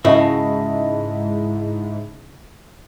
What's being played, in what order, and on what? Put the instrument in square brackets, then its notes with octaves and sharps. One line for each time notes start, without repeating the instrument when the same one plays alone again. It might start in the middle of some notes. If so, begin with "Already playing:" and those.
[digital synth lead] G#2 [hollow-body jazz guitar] C#3 F#4 [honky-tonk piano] E4 D#5 A5